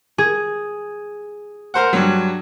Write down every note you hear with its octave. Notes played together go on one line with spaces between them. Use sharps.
G#4
A#4 C5 F#5
G2 F#3